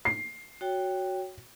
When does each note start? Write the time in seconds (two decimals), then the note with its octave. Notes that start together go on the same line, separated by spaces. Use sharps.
0.05 C7
0.61 F#4 C#5 G5